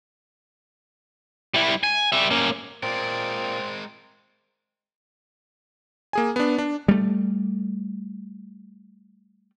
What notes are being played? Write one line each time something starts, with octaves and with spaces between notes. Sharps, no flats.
G3 E4
G#5
G3 E5
A#3 C#4
A#2 G#3 A#3 C4 A#4 D5
A#3 G#4 G#5
B3 D4
D4
G3 A3